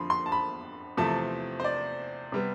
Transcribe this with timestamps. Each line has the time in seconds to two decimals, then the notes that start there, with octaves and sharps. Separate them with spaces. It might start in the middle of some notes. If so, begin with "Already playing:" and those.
Already playing: F2 D3 F3 B5 C6
0.10 C6
0.26 A5
0.32 B5
0.97 E2 C3 F3 A3 A5
1.60 C5
1.64 D5
2.32 C3 G3 B3